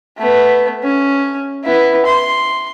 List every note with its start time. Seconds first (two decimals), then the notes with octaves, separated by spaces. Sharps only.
0.18 A3 B3
0.83 C#4
1.64 B3 E4
2.06 C6